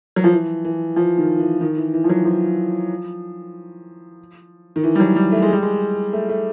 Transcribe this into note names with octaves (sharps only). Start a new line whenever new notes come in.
F#3
F3
E3
E3
F3
D#3
E3
D#3
E3
E3
F3
F#3
F3
D#3
E3
G3
F#3
G3
A3
G#3
G3
G#3
A3
A3